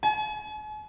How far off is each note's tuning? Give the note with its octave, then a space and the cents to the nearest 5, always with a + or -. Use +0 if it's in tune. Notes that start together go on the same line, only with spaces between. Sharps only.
G#5 +45